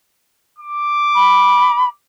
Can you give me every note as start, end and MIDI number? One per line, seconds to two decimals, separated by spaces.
0.58 1.92 86
1.15 1.86 83